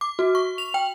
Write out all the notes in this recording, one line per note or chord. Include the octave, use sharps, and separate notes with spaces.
D6
F#4
C#6
F7
G5